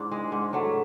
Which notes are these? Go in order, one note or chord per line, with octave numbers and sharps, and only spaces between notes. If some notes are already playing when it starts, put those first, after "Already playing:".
Already playing: G#2 D4 E4
G#3
G#2
F#3 A3